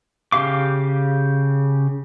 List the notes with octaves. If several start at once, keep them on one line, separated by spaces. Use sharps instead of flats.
C#3 G4 F5 D6